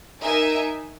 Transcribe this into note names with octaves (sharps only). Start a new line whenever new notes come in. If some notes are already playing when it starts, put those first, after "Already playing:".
D#4 A#4 E5 G#5